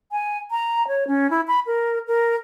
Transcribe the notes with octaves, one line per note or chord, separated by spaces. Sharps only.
G#5
A#5
C#5
C#4
E4
B5
A#4
A#4